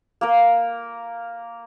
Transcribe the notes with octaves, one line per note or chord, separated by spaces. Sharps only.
A#3 A#4